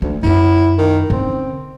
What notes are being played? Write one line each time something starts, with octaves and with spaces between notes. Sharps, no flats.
D2 E3
F#2 E4 F4
D#3
D3 C4 C#4